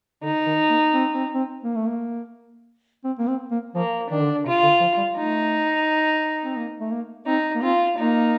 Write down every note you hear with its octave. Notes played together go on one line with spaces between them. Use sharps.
D3 D#4
D#3
A#3
C4
C4
C4
A#3
A3
A#3
C4
A#3
C4
A#3
F3 A#3
D#3 D4
D3
C3 F4
D3
F3
G3
A3 D#4
C4
A#3
A3
A#3
C4 D#4
A#3
C4 F4
A#3 D#4